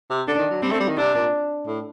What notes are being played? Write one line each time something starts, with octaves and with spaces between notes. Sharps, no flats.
C3
D3 D4
D#3
F#3
G3 C4
A3
G3
D#3
C3 D4
A#2
A2